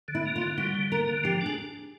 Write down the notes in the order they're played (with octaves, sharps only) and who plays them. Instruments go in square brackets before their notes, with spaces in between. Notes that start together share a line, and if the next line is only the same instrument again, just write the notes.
[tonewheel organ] D3
[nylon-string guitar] E4
[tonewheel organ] A#3
[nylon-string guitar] F4
[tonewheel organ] D3
[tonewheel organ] G3 [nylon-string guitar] F#4
[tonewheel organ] D3
[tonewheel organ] A#3 [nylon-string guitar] A#4
[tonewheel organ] D3
[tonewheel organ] F3 [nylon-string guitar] G4
[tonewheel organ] D4 [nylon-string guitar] G#4